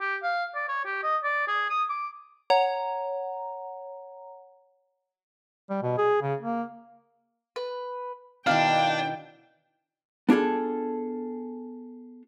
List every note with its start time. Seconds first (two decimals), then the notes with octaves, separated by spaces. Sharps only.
0.01 G4
0.23 F5
0.55 D5
0.69 C#5
0.85 G4
1.03 D#5
1.24 D5
1.48 G#4
1.70 D#6
1.90 D6
2.50 C#5 F#5 A#5
5.70 G3
5.83 B2
5.98 G#4
6.22 C#3
6.41 A#3
7.56 B4
8.47 B2 D#3 D4 E4 F5 G5
10.29 B3 D4 F4 G#4 A4